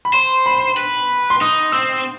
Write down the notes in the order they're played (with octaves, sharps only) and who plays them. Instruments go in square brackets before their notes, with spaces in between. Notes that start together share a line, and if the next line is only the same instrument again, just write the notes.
[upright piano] B5
[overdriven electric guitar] C5 [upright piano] C6
[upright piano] B5
[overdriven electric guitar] B4
[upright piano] C6
[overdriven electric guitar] D#4 [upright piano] D#6
[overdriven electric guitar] C4 [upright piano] E6